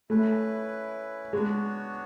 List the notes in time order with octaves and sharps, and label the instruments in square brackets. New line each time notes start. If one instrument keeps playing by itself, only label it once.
[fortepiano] A3 [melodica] C#4 E4 B4
[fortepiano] G#3 [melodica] B3 D4 F#4 C#5